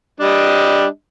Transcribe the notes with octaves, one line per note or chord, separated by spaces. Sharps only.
G3 D4 D#5